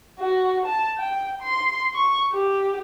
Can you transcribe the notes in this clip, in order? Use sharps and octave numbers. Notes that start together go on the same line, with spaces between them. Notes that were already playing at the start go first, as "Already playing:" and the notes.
F#4
A5
G5
C6
C#6
G4